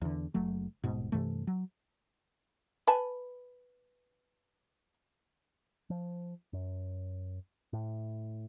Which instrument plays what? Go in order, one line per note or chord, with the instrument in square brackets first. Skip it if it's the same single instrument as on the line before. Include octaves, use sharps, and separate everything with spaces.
[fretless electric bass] E2 D3
F#1 F#3 A3
D#1 G#2 B2
G2 C3 E3 A3
F#3
[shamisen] B4 G#5 A5
[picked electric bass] F3
F#2
A2